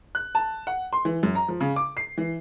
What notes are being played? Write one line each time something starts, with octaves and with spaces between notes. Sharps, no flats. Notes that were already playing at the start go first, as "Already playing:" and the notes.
F#6
A5
F#5
C6
E3
F#2
A#5
F3
C#3
D6
C7
E3